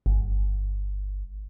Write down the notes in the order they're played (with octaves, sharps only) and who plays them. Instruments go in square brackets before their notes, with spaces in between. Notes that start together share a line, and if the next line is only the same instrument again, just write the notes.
[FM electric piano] G1